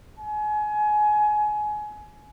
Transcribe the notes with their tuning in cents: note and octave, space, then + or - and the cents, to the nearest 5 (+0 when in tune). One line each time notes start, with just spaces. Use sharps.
G#5 +25